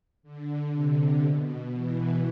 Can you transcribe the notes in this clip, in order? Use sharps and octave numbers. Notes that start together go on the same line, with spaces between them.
D3
C3
B2
E3